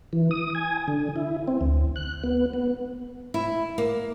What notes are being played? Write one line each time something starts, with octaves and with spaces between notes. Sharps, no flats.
E3
D#6
G#5
D3
E4
C4
D2
F#6
B3
B3
E4
A#3